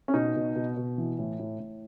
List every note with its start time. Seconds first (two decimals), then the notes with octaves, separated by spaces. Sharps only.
0.08 C#4
0.14 B2 D#4
0.36 B2
0.56 B2
0.77 B2
0.98 E3
1.19 A2
1.39 A2
1.60 A2